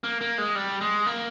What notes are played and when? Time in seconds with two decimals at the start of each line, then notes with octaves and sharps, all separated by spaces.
0.04 A#3
0.21 A#3
0.38 G#3
0.55 G3
0.81 G#3
1.06 A#3